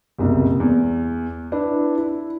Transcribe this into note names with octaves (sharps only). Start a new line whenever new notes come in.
F#1 C2 B2
E2
D4 E4 B4
E4